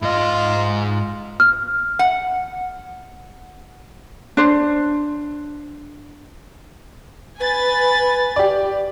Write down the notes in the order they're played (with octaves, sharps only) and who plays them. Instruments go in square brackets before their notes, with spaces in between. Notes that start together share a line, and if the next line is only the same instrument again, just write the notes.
[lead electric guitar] G#2 D#5 [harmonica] F4
[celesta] F6
[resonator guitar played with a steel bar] F#5
[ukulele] D4 C5
[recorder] B4 [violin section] G#5 B5 A6
[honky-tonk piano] G4 D5